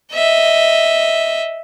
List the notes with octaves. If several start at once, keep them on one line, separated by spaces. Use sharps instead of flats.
D#5 E5